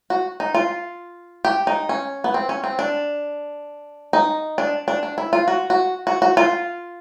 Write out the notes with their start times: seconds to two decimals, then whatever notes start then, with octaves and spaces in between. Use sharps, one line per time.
0.10 F#4
0.40 D#4
0.55 F4
1.45 G4
1.67 D#4
1.89 C#4
2.24 B3
2.34 C4
2.49 C#4
2.64 C4
2.79 D4
4.13 D#4
4.58 D4
4.88 D4
5.03 D4
5.18 E4
5.33 F4
5.48 F#4
5.70 F#4
6.07 F#4
6.22 F#4
6.37 F4